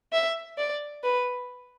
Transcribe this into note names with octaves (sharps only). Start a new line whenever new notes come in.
E5
D5
B4